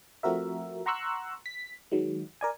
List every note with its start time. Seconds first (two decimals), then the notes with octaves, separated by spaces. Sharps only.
0.23 F3 A3 C4 F#4 A#4 E5
0.86 F#5 A#5 C6 C#6 E6 F#6
1.46 B6
1.92 D#3 F#3 G#3
2.41 A#4 D5 G#5